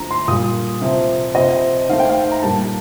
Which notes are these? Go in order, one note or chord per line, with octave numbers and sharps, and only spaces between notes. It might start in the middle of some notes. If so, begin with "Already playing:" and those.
Already playing: D3 F3 A3 A#5
C6
A#2 G3 A#3 D#6
C3 F3 C4
C3 F3 C4 D#5
D#3 A3 C4 F5
G5
F5
A#5
A#2 G3 A#3 D4 A5